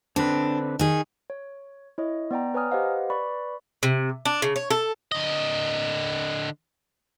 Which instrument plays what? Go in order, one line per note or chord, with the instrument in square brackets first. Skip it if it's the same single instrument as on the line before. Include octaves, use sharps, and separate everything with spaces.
[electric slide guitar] D3 C4 B4 [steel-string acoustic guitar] D4
[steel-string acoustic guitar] D#3 G#4
[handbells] C#5
E4 C#5 D#5
B3 D5 G5 A#5
B4 C#5 G#5 A#5 D#6 F6
G4 B4 C5 D#5 F5 F#5
B4 D5 B5 C#6
[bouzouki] C3
D4
C#3
C#5
A4
[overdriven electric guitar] D3 D#5